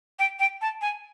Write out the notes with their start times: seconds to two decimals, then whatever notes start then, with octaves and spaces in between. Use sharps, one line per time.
0.19 G5
0.39 G5
0.62 A5
0.82 G#5